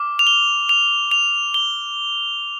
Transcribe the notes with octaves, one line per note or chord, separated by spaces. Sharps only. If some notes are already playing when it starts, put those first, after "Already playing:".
Already playing: D6 F6
F7
G7
F7
F7
G7